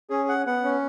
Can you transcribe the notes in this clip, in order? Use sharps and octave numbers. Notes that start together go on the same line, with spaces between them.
C#4 G#4
F#5
B3 F#5
C#4